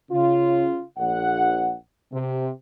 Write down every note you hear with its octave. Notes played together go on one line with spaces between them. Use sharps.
C#3 F4
A#1 F#5
C3